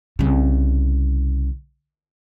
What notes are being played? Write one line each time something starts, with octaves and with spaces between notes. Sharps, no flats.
C2 C#3